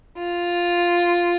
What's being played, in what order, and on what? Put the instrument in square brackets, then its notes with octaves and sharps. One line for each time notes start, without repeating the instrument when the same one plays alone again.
[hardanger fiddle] F4